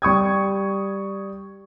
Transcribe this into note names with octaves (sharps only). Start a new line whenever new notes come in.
G3 C#6 D#6 G#6